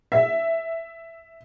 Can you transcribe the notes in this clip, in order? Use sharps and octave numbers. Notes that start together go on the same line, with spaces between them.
E5